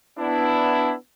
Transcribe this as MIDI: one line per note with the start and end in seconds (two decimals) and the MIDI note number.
0.18 0.94 59
0.18 0.94 62
0.18 0.94 64